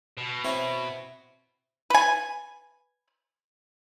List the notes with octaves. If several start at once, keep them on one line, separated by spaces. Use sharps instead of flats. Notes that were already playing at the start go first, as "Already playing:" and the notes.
B2
C4 E4 C#5
B4 G#5